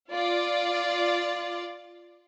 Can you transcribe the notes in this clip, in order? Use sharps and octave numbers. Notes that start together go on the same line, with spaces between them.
F4 D5